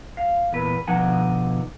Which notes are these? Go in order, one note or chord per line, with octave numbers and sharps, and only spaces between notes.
F5
E2 A#2 B4
B2 D3 F3 D#4 F#5 G#5